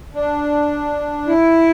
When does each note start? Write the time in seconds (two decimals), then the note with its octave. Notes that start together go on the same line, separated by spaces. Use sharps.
0.14 D4
1.27 E4